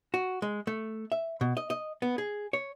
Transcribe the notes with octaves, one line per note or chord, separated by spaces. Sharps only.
F#4
G#3
A3
E5
B2
D#5
D#5
B3
G#4
C#5